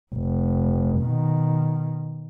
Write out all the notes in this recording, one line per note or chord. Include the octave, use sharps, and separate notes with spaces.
F1
B2 D#3